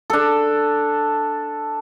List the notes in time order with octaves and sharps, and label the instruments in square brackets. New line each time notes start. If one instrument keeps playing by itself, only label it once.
[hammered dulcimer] D4 A4